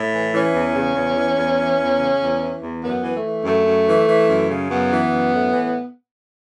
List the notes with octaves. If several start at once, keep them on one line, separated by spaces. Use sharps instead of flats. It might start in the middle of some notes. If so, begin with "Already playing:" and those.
Already playing: A2
E3
E3 C#4
E2
C#3
E2
E3
E2
E3
E2
C#3
E2
E3
E2
F#2 B3
E3
A3
E3
F#2 A3
F#2
E3
E3
F#2
C#3
F#2 B3
E3
F#2
A2
E3